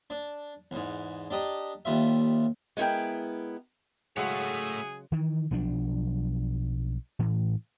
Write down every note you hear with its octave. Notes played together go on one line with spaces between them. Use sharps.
D4
E2 G#2
D4 G4 D#5 A#5
D#2 G3 F4 E5
G#3 B3 E4 A#4 G5
C#3 F#3 G#3 A3 G#4 C#5 F#5
D#3 E3
B1 F3 F#3 D4
A2 E3